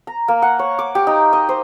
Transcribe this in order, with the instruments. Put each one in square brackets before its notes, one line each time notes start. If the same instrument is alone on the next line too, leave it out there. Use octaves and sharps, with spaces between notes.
[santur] A#5
A#3
F#5
C#5
D6
G4
D#4
D#5
C5